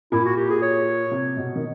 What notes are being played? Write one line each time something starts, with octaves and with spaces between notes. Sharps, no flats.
A#2 E4
F#4
G4
G#4
C#5
C3
B2
D#3